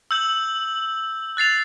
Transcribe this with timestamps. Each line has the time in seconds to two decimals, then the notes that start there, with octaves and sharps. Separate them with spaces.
0.11 E6 G6 F#7
1.37 F#6 A6 C7 F7